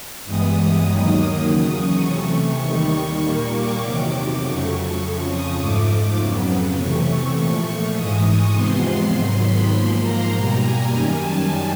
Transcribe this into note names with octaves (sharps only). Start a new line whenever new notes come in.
G2 E3 G#3 B3 D#6
D#6
D#2 D#3 F#3 A#3
E2 C#3 F#3 D#6
C#6
C3 E3 A3 C#6
D#2 D#3 G3 C#6
A#2 G3 A#3
D6
E2 C3 D#3 F#3
D6
F2 C#3 F#3 A3 C#6
F2 C#3 F3
D#6
G#2 F3 A3 D6
F2 C#3 F#3 B3
C3 E3 A3 C#6
A#2 F3 A3 C#6
C#6
G#2 E3 G#3 D#6
C#6
E2 C3 F3 G#3 B3 C6
G#2 D#3 F#3 B3
B5
G#2 F3 A#3 C6
A#5
B2 G3 A#3
G#5
F#2 D#3 G3
A5